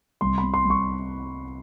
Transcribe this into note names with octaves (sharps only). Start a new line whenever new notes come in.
C2 C6
C3 B5
C6
C2
C#6